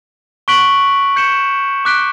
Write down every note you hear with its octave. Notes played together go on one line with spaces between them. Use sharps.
C#6 F#6 B6 D7 F#7
G6 C#7 E7 G7
D6 F#6 B6 D7 G7